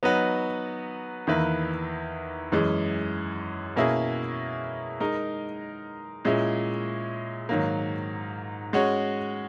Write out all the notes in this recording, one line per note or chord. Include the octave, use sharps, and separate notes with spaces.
F#3 B3 D#4 F#4 B4
E2 D#3 A#3 E4 B4
F#2 E3 G#3
B2 A#3 C#4 E4 G#4
G#3 D#4 A#4
A#2 G#3 C#4 E4
G#2 D#3 F#3 A#3
G#3 C#4 F#4 C#5